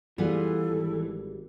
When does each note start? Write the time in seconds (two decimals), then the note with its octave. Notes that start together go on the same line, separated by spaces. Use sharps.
0.18 E3 G3 B3 F4 G#4 A4
0.69 G#1